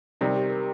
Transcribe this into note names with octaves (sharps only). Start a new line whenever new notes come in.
C3 G3 D#4 A#4
G4
A#4